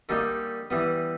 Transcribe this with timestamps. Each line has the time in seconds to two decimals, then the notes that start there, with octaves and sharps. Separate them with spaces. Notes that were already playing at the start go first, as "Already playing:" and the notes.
0.09 D3 G3 A#3 D#4 G4
0.70 E3 G3 B3